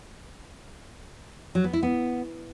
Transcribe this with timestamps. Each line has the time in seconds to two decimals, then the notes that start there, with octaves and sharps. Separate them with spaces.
1.55 F#3
1.64 B3
1.73 E4
1.83 B3